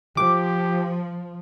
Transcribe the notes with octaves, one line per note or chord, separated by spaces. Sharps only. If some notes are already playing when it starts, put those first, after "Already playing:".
F3 G4 D6